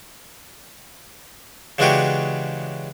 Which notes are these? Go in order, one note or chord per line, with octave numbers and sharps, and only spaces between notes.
C#3 E3 G#3 D4 F#4 G4